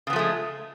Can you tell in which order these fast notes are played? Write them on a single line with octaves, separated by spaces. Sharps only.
C#3 B3 F3 A3 G#3